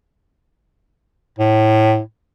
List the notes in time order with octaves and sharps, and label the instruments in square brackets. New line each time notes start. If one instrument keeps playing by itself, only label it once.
[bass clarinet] A2